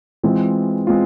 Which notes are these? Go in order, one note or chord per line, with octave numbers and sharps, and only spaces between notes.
E3 G#3 C4 F4
G#3 C4 F4